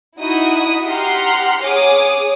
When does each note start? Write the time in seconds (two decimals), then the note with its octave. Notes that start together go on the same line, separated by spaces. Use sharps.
0.18 D#4 E4 F#4 D#6
0.89 G4 F#5 A#5 C6 F6
1.62 G#4 C#5 D6 D#6